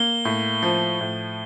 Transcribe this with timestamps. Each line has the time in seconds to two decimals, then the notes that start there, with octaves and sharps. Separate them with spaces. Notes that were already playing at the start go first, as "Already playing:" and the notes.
Already playing: A#3 G7
0.25 A2
0.63 F3
1.01 A2